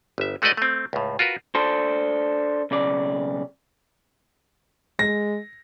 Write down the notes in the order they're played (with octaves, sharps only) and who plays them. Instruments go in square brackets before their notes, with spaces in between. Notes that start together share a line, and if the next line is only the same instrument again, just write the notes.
[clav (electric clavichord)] G1 E5
G#3 A3 F#4 B4 D5 D#5
A3 C4
C#2 A2
F4 F#4 A#4 B4
[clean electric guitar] D4 A4 C5
B1 C#3 D5
[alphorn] G#3 [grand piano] A#6